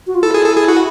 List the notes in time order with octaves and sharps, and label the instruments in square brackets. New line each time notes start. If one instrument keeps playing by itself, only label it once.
[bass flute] F#4
F4
[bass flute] E4 [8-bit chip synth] A4
[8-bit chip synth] G#4
A4
G#4
F#4